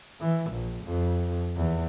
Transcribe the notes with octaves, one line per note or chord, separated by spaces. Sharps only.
E3
A#1
F2
E2